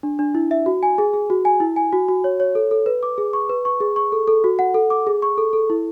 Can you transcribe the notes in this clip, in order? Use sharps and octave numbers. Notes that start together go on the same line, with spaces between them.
D4
D4
E4
E5
F#4
G#5
G#4
G#4
F#4
G#5
E4
G#5
F#4
F#4
C#5
C#5
A4
A4
B4
D6
G#4
C#6
B4
C#6
G#4
C#6
A4
A4
F#4
F#5
A4
D6
G#4
C#6
A4
A4
E4